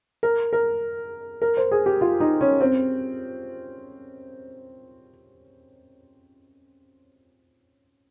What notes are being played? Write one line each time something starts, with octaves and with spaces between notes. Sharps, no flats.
A#4
A#4
A#4
C5
G#4
G4
F4
D#4
C#4
C4